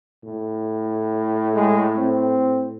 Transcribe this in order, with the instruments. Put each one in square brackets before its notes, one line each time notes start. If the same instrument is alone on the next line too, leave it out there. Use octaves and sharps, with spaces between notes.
[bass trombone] A2
[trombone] G#3
C4